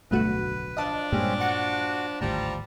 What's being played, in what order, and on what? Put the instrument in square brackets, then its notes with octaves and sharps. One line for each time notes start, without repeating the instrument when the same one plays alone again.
[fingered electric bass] D1 B1 D3 [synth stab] G2 A3 F#4 [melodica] B4
[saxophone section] F3 D4 [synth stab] D#5 F5 A5
[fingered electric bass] G2 A#2 A#3 [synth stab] G3 G#3 [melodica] C4 C#4
[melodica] F#4 [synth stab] F#5 A6 C#7
[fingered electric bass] G#1 D2 A2 [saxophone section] F3 G3 [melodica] A5 A#5